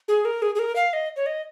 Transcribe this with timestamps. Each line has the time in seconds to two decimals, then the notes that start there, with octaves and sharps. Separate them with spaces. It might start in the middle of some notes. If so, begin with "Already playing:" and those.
0.08 G#4
0.25 A#4
0.42 G#4
0.55 G#4
0.59 A#4
0.76 F5
0.93 D#5
1.16 C#5
1.26 D#5